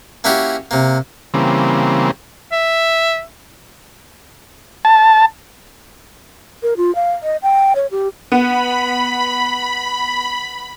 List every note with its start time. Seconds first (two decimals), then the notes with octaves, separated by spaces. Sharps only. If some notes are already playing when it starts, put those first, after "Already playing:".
0.24 A#3 C#4 E4 F#4 G4 A#4
0.71 C3 A#3
1.34 C#3 E3 G3 A#3 C4
2.52 E5
4.85 A5
6.63 A#4
6.77 F4
6.95 F5
7.23 D#5
7.43 G5
7.76 C#5
7.91 G4
8.32 B3 B5